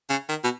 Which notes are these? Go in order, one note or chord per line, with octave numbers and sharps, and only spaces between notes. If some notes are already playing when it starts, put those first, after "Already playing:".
C#3
D#3
B2